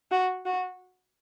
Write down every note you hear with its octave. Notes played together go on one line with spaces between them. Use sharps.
F#4
F#4